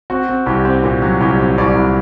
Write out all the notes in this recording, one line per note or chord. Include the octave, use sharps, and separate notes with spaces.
C4 F#4
C4
C2 G4
C4
A#2 G4
F#3
C2 G4
C4
C2 D5
C2